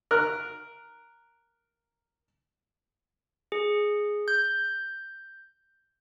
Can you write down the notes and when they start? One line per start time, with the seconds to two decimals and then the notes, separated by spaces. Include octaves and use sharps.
0.11 A#4 F6 F#6
3.52 G#4
4.28 G6